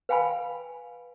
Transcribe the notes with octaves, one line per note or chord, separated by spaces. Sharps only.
B4 F5 G5 G#5 B5